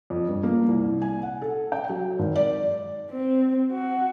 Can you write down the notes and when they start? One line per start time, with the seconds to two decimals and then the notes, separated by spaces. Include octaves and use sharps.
0.10 F2
0.28 G2
0.43 A#3
0.68 C2
1.02 G#5
1.23 F#5
1.42 A4
1.72 G5
1.89 F#3
2.19 G#1
2.36 D5
3.10 C4
3.72 F#4